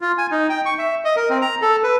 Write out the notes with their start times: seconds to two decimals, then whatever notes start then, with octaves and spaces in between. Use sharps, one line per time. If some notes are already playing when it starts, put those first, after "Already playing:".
0.01 F4
0.18 G#5
0.31 D#4
0.50 G5
0.66 C#6
0.79 E5
1.05 D#5
1.16 A#4
1.30 C4
1.42 A#5
1.62 A4
1.84 B4